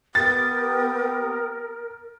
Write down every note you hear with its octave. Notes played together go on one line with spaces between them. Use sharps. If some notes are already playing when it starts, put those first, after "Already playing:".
B3 G4 A#4 G5 D#6 A6